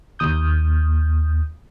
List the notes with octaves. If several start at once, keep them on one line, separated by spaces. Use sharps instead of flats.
D#2 D#6 G6